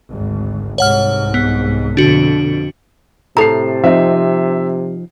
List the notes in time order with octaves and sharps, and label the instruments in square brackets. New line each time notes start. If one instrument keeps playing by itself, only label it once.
[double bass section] G#1 D2
[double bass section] C2 G#2 [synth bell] C#5 F#5 F6
[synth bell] B3
[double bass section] F2 B2 D3 [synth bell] D4 F#4
[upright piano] A2 A5 C7 [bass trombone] C3 [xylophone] A4 A#5
[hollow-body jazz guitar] F3 C4 D#4 [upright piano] E5